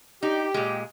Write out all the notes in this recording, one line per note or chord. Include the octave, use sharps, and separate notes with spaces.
D#4 G4
A#2 G#3